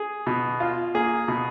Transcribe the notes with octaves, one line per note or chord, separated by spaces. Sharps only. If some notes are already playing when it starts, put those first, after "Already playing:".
Already playing: G#4
B2
F4
A#3 G#4
B2